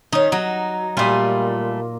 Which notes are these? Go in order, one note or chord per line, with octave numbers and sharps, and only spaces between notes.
D#3 C#4 D#4
F#3 D#4
A#2 G3 A3 F4 G#5